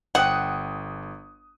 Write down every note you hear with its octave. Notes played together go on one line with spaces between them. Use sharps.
G1 C5 F#5 G5 D#6 F#6